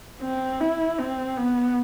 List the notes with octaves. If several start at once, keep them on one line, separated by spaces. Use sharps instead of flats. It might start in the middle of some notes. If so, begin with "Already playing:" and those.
C4
E4
C4
B3